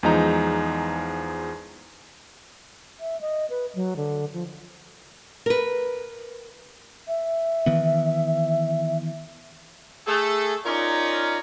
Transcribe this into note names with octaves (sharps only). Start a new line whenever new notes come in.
E2 F3 G#3 D#4 A#5
E5
D#5
B4
F#3
D3
F3
A#4 B4
E5
D#3 E3 B3
A3 G#4 A4
C#4 D#4 F4 A#4 C#5 D5